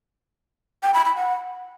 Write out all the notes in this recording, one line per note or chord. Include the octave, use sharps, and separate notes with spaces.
G5
B5
B5
F#5